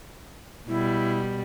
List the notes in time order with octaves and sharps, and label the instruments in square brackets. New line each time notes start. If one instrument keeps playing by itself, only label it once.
[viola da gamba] B2 G3 [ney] E4